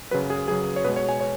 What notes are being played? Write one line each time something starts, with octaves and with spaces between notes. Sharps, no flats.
F#2 C#3 F#3 B4
G#4
F#2 C#3 F#3 G#4
C#5
B2 G#3 B4
C#5
G#5
C#5